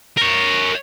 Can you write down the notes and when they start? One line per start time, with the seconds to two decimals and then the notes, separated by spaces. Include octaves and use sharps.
0.17 A#4 C#5